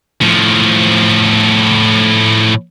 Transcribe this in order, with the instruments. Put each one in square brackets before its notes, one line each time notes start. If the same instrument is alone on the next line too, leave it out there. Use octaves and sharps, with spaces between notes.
[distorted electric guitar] A2 F3